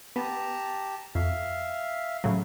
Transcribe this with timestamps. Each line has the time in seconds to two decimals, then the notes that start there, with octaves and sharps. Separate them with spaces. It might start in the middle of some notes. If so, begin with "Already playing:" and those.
0.16 B3 G4 A5 A#5
1.15 F2 E5 F5
2.24 A2 C#3 F#3 E4